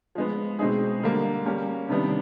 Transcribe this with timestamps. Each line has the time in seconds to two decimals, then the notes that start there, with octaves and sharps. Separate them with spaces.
0.15 F3 G#3 B3
0.59 B2 G#3 C4 D#4 G#4
1.03 D3 G3 A#3
1.46 G3 A#3 C#4
1.89 C3 D#3 G3 B3 D4